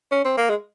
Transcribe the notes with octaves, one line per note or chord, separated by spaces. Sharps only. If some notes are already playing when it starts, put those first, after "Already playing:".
C#4
C4
A#3
G#3